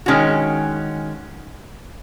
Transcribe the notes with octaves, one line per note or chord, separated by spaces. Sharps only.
D#3 G#3 C#4 F#4